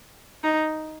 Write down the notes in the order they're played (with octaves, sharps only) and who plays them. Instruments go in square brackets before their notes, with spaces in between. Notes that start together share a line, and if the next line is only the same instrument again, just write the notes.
[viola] D#4